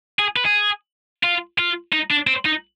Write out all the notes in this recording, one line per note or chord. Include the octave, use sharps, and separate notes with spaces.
G#4
B4
G#4
F4
F4
D#4
D4
C4
D#4